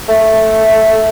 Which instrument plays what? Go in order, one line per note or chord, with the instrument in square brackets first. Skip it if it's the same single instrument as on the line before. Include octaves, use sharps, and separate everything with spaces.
[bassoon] A3